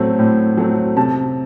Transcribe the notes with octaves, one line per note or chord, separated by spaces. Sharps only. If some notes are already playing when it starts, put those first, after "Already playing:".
Already playing: A2 F#3 A3 C4
A2
F#3 A3 C4
C3 A5